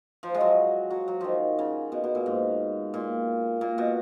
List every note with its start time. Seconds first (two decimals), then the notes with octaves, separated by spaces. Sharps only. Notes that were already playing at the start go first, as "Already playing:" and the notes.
0.23 F3
0.35 G#3
0.40 F#3
0.90 F#3
1.08 F#3
1.21 D#3 F3
1.59 C#3
1.92 B2
2.04 B2
2.15 A#2
2.26 G#2
2.94 A#2
3.61 A#2
3.78 B2